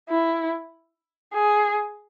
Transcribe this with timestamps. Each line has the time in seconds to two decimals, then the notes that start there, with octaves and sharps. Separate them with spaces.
0.09 E4
1.34 G#4